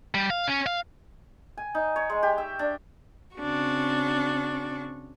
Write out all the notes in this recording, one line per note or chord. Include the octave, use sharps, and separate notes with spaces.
G3
F5
C#4
F5
G#5
D#4
C#5
G#3
G4
E5
D4
C#3 C4 D4 F#4 C#6